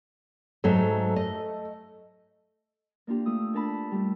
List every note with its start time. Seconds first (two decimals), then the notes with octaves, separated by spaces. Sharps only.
0.64 G#2 F#3 A3
1.16 D#5
3.07 A#3 D4 F4 G4
3.26 A3 F4 D#6 E6
3.54 D4 A4 A#4 A5 B5
3.91 G3 A3